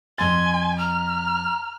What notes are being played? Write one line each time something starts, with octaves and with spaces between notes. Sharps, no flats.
F2 G#5 C6 A6
A#5 F6